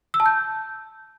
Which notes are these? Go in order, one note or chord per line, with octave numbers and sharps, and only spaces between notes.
E6
A5
G6